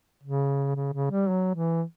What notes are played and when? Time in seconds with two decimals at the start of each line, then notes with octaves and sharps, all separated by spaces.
0.23 C#3
0.76 C#3
0.93 C#3
1.11 G3
1.29 F#3
1.55 E3